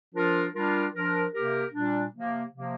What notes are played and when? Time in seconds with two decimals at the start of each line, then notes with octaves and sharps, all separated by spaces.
0.15 F3 D4 F4 A#4
0.54 G3 D4 F4 A#4
0.94 F3 D4 A#4
1.34 C3 A#3 G4 A#4
1.73 A#2 G3 D4
2.12 C3 F3 A#3
2.51 C3 F3 A#3